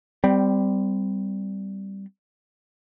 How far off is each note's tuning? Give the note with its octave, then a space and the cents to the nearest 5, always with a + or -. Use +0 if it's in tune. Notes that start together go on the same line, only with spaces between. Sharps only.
G3 +0 C4 -25